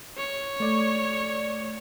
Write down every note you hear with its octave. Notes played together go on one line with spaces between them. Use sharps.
C#5
A3 D5 G#6